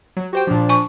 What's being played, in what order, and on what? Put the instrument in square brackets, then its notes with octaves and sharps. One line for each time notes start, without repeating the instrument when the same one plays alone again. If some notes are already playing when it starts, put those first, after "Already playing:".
[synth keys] F#3
[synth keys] F#4 C5 G5 [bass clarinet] G4
[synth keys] A#2 F3 [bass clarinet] D4
[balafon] G#5 C#6